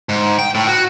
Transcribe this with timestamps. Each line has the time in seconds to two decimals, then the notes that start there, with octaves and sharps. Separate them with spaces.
0.09 G#2
0.39 G5
0.55 A2
0.68 F#4